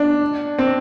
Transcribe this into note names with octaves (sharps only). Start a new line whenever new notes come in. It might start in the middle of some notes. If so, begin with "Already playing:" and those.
Already playing: D4
C4